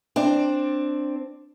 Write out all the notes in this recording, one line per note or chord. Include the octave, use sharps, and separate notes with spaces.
C4 D4